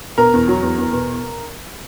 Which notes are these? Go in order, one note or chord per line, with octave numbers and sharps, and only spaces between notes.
B2 A#4
E2
F#3
E2
E2
B2